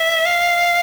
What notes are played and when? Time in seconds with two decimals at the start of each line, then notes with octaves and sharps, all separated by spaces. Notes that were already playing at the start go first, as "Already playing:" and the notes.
Already playing: E5
0.26 F5